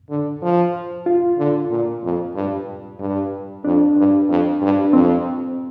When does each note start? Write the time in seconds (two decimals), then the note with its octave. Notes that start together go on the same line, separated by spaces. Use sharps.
0.10 D3
0.42 F3
1.06 F4
1.38 D3
1.71 A#2
2.03 F2
2.35 G2
3.00 G2
3.64 F2 D4
3.97 G2
4.29 F2
4.62 G2
4.85 D4
4.93 F2 C4